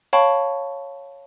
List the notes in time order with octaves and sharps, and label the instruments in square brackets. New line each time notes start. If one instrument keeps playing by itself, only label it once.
[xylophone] C#5 F5 G5 A5 B5 C#6